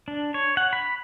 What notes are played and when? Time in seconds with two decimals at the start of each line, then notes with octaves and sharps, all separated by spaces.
0.08 D4
0.34 C#5
0.57 F#5
0.73 B5